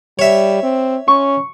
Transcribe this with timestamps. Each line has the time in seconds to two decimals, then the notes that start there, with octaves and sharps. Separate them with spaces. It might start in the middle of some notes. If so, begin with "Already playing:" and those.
0.19 G3 C#5 E5
0.63 C4
1.08 C#4 C#6